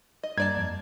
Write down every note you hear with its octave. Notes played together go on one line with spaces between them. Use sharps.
D#5
G2 A#3 D5 A5 G#6
F2